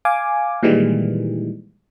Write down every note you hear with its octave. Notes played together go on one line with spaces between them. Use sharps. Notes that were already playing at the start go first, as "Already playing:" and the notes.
F5 G#5 D6
A#2 D#3 E3 G3 G#3